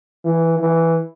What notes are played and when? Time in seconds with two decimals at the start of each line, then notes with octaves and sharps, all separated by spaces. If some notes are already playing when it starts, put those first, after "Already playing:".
0.24 E3
0.59 E3